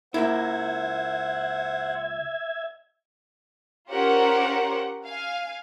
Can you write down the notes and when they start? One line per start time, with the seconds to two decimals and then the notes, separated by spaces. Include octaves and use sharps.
0.14 C#2 A#3 E4 C5 E5 F#5 G#6
3.91 C#4 F4 G4 A#4 C5 F#5
5.06 F5 G#5